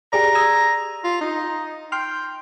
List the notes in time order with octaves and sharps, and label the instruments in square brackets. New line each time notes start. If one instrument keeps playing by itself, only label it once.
[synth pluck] G4 G#4 D5 [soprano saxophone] A#5
[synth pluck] D#6 E6 G#6
[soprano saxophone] F4
D#4
[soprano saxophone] G5 [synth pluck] C6 F6